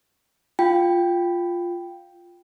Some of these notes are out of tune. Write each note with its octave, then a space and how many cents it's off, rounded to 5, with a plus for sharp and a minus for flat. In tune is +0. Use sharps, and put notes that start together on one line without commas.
F4 +0 G5 +0